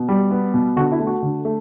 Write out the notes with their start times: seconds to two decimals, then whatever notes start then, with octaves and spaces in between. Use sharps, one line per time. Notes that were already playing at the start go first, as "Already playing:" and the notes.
Already playing: B2
0.09 G3
0.31 B3
0.54 B2
0.76 D3 F#4
0.92 E4
1.00 A3
1.07 F#4
1.22 D3
1.45 A3